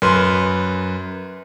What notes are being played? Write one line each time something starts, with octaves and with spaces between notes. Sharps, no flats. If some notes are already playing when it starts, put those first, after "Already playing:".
F#2 B4 C6